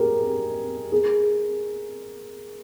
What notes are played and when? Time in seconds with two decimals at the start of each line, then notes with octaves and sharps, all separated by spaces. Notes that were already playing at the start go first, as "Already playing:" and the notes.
Already playing: G4 G#4 A#4
0.92 G#4